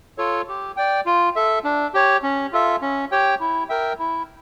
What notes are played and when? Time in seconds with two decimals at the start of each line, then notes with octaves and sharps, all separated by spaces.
0.18 F4 A4 C#5
0.48 G4
0.77 D5 G5
1.06 F4
1.36 A4 E5
1.64 D4
1.94 G4 C#5
2.23 C#4
2.53 F4 A4 E5
2.82 C#4
3.12 G4 C#5 G5
3.40 E4
3.69 A#4 E5 G5
3.99 E4